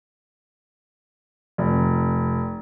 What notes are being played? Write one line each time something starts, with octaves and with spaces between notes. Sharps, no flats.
F1